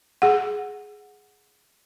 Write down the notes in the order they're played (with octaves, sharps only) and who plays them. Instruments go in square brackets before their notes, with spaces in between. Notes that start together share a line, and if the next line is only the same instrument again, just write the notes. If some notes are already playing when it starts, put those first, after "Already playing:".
[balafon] G#4 F#5